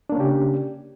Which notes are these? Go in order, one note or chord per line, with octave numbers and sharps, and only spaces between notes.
C#3 A#3 C#4 D4 G4